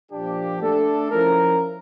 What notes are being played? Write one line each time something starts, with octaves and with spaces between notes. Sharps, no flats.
A#2 F3 A#3 D4 G4
A3 D4 A4
F3 C#4 E4 A#4